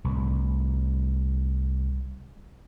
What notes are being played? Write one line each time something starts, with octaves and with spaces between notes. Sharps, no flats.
C2 A2